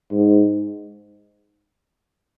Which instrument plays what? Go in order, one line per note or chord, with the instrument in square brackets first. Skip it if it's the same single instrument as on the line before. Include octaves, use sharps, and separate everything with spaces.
[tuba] G#2